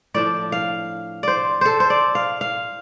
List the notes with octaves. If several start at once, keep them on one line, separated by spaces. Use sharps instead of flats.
A2 F3 D4 D5
F5
C5 D5
A4 C5
C5
D5
F5
F5